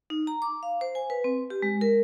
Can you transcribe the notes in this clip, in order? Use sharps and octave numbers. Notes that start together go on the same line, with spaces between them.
D#4
A#5
D6
F5
C5
G#5
B4
C4
G4
G#3
A#4